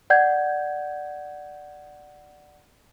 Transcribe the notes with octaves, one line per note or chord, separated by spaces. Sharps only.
D5 F#5 G6 G#6